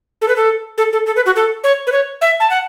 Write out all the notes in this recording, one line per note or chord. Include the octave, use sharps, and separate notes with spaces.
A4
B4
A4
A4
A4
A4
B4
F#4
A4
C#5
B4
C#5
E5
A5
F#5